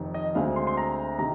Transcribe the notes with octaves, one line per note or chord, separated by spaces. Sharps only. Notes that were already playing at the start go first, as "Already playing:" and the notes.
Already playing: F1 F2 D#3
D#5
D2 D3 G#3 C4 F5
C6
C6
A#5
C3 D#3 A#5